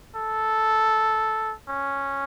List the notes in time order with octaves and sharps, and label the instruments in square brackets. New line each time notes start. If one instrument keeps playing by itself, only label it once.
[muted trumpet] A4
C#4